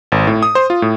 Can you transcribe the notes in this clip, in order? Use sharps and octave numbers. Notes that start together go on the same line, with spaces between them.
G#1
A2
D#6
C5
F4
A2